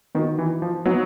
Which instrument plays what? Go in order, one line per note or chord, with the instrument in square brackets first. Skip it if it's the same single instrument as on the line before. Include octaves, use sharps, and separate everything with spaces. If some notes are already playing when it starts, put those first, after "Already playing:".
[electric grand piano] D#3 [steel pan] B3 D#4 F#4
[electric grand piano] E3
F3
[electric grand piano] F#3 [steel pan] B3 D#4 F#4